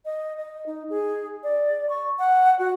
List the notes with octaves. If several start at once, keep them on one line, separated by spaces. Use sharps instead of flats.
D#5
D#5
D#4
G#4
D5
C#6
F#5
F#4